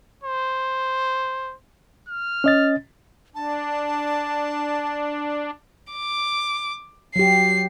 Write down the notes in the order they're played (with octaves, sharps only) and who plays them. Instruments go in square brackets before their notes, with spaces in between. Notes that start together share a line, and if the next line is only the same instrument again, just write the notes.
[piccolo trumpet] C5
F6
[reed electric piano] C#4 D#5 A6
[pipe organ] D4 [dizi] A5
[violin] D6
[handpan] F#3 G4 [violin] C7